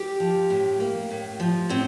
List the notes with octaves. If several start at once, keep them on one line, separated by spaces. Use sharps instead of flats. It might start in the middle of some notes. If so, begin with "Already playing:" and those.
Already playing: G4
F3
A2
A#3
A2
F3
A2 C4